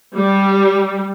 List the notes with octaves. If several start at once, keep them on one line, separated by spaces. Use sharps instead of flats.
G3